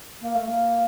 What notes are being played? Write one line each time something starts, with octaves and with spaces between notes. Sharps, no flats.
A#3
A3
A#3